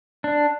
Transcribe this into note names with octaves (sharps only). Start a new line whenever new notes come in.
D4